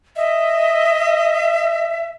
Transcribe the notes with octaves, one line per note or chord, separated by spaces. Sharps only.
D#5 E5